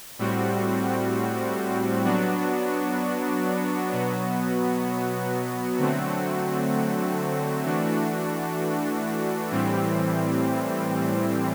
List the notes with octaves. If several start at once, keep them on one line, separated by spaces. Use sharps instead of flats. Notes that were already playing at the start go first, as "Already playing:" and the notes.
A2 G3 C4 F#4
F#3 B3 D4 F#4
B2 F#3 B3 F#4
D3 F#3 A3 C4 F#4
E3 A3 D4 F#4
A2 E3 G3 C4